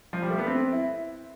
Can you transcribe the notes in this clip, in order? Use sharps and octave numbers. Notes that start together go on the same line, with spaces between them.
F3
G3
A3
B3
C4
E4